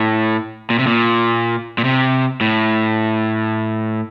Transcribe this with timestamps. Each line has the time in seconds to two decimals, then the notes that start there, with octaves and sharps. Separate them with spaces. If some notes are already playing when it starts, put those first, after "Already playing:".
Already playing: A2
0.70 A#2
0.79 C3
0.87 A#2
1.78 A#2
1.84 C3
2.41 A2